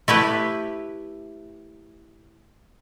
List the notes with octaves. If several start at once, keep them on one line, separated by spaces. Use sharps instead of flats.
A3 E4 G4 B4